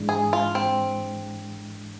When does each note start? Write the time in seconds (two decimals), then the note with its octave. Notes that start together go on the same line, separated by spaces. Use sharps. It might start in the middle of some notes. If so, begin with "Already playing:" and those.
Already playing: G#2 E3 G#3 D4
0.09 G#4
0.33 F4
0.55 C4